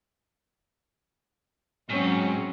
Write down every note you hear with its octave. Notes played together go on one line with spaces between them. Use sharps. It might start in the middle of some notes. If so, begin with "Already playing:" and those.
G#2 F#3 C4 C#4